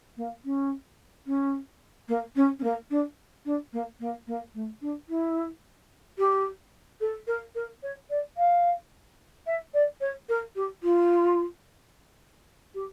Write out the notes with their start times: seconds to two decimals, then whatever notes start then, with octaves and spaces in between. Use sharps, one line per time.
0.17 A#3
0.44 C#4
1.26 C#4
2.08 A#3
2.35 C#4
2.59 C#4
2.63 A#3
2.90 D4
3.45 D4
3.72 A#3
3.99 A#3
4.27 A#3
4.54 A3
4.81 D4
5.09 E4
6.18 G4
7.00 A4
7.27 A#4
7.55 A#4
7.82 C#5
8.10 D5
8.37 F5
9.46 E5
9.73 D5
10.00 C#5
10.29 A#4
10.55 G4
10.83 F4
12.74 G4